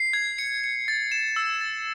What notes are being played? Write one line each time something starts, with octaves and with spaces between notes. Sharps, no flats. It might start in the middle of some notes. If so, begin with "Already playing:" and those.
Already playing: C7
G#6
C#7
C#7
A6
E7
E6
A6